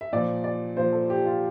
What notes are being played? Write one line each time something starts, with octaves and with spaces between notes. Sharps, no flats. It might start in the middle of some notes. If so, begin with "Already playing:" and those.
E5
A#2 F3 D5
D5
A#2 F3 C5
A4
G4
F4